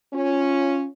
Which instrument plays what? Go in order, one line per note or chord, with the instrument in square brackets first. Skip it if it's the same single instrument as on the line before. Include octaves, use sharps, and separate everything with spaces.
[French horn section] C#4 F4